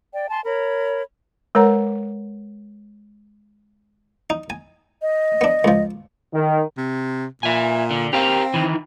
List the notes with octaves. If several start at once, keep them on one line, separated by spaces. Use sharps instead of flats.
D5 G5
G#5 A5 C6
A#4 C#5 B5
G#3 A#4 B4 C#5 F#5 A#5
D#4
G#5
D#5
B3 D4
C#2 F3
D#3
C3
A#2 E5 G#5
D3
C4 G4 A#4 F5
D#3 E3